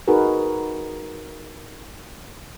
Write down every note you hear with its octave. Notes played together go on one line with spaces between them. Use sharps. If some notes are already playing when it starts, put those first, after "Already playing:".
D#4 F#4 G#4 A#4 B4